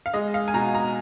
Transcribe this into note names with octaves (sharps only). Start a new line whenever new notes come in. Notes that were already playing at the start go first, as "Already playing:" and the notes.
F5
G#3 D#5
F5
G#5
B2 A#5
A#5